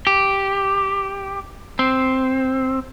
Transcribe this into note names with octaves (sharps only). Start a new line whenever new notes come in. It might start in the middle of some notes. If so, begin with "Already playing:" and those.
G4
C4